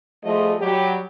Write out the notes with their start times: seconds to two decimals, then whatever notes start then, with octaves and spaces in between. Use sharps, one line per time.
0.24 F3 G3 A3 F4 G#4 D#5
0.59 F#3 G3 G4